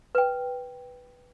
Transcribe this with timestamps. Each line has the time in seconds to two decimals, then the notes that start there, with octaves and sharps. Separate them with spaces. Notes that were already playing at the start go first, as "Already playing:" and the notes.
0.15 B4 G5